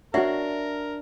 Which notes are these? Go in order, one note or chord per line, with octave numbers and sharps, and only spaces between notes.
D4 F#4 A#4 C#5 E5 F#5